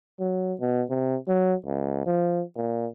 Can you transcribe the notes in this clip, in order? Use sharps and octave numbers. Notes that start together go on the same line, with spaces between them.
F#3
B2
C3
F#3
C#2
F3
A#2